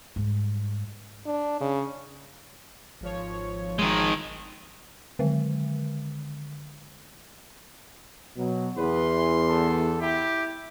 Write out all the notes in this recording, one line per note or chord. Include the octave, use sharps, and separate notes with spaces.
G#2 G3
D4
C#3
G#1 F3 C#5
D#3 G#3
D3 D#3 G#3
B2 F#3
E2 B4 C6
A4
E4 G4